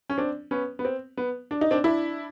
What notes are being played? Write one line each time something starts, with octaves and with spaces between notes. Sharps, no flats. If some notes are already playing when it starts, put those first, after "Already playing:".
C#4
C4 D4
B3 C#4
B3
C4
B3
D4
D#4
C4 D4
D4 E4